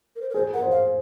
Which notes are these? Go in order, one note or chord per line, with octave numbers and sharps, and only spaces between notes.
A#4
C5
A#4
G#4 C5
A#4 F#5
C5
F5